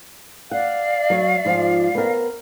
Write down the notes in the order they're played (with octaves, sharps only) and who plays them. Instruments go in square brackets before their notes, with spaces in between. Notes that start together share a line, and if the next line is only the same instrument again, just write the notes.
[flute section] D5 F5 [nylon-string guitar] F#5
[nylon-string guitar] F#3 C#5
G#2 F3 F4
B3 C4 A#4